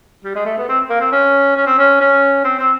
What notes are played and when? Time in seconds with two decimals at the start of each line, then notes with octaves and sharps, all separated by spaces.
0.24 G3
0.35 G#3
0.46 A3
0.58 B3
0.69 C4
0.90 A#3
1.00 C4
1.12 C#4
1.57 C#4
1.66 C4
1.78 C#4
2.01 C#4
2.44 C4
2.59 C4